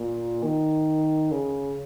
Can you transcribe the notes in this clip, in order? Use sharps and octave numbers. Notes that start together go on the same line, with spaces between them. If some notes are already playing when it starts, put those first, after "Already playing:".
Already playing: A#2
D#3
C#3